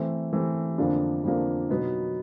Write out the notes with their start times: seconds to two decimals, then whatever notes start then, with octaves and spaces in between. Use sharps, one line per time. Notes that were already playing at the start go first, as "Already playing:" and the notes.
Already playing: E3 A3 C4
0.33 E3 A3 C4
0.78 F2 D3 F3 A#3 D4
1.24 F2 D3 F3 A#3 D4
1.70 B2 F#3 B3 D#4